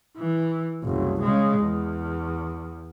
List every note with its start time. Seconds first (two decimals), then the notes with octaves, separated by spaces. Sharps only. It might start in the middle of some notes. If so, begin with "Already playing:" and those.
0.18 E3
0.84 F#1 C2
1.22 C#3 G#3
1.59 E2